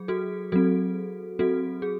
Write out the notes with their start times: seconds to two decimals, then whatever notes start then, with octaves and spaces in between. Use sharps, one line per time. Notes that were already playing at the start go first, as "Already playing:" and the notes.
Already playing: F#3 G#4
0.08 F#4 A4
0.52 F#3 C4 F#4 A4
1.39 F#3 C4 F#4 A4
1.82 G#4